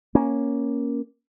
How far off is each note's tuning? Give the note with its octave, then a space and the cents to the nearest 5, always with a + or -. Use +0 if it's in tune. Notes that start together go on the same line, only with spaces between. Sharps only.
A#3 +10 C#4 +0